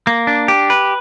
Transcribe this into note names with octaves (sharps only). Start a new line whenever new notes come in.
A#3
D4
G4
B4